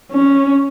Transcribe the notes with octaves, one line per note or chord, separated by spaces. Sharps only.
C#4